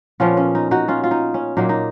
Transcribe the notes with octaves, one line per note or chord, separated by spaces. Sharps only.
A#2 F3 B3 C#4 F4
C#4
D#4
D#4 F#4
C#4 F4
F4
D#4
C#4
A#2 F#3 A#3 D#4
D#4